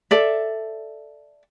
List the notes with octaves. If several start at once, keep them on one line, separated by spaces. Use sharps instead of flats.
A4 D5 E5